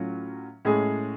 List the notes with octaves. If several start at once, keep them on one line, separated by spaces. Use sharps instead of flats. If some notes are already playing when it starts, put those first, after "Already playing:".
Already playing: A2 F#3 C#4 F4
A2 G#3 C#4 G#4